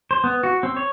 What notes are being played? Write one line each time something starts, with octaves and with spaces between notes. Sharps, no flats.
C5
B3
F#4
C4
C#5